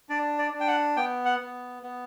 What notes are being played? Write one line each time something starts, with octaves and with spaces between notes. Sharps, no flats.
D4 D5
D5
D4
G5
F#5
B3 G5
F#5
B3
B3